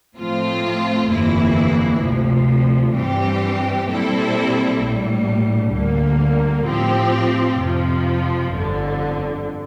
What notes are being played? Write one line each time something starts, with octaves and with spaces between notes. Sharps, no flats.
A2 F3 A3 C4 F4
G1 F2 E3 A#3 E4
D2 C3 F3
G2 E3 G3 C4 G4
A#2 G3 C4 E4 A4
A#1 A2 G3
D2 D3 G3 A#3
A2 F3 C4 G4
F2 C3 F3
G1 F2 D3